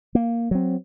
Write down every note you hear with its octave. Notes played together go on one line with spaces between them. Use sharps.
A#3
F#3 C4